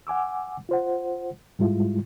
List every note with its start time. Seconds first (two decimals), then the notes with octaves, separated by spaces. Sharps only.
0.07 F#5 G#5 D6 E6
0.69 F4 C5 F#5
1.59 G#2 G3 G#3 E4 F4